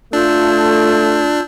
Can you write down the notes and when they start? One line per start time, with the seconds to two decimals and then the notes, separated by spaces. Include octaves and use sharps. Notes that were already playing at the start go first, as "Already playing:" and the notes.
0.13 A3 D4 F4 A5 E6 G6